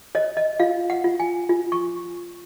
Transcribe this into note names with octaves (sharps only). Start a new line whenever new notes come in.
C#5 D#5
D#5
F4 F5
F#5
F4
G#5
F4
C#6